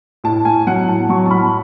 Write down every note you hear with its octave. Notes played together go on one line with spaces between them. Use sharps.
A2 A5
A2 G#5
F#3 F#5
A2 A5
F#3 C#6
A5
A2 B5